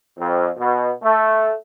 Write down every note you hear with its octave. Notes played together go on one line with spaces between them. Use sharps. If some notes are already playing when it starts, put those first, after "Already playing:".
F2
B2
A3